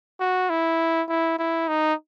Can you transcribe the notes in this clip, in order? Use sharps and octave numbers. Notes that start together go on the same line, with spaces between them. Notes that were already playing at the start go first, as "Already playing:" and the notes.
F#4
E4
E4
E4
D#4